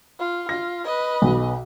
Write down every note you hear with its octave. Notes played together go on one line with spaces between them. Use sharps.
F4
F4 A#6
B4 D#5
B1